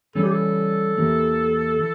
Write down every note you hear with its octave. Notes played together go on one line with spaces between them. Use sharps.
E3 G3 C#4 A4
G4
A4
E2 E3 A#3 E4 G4
E3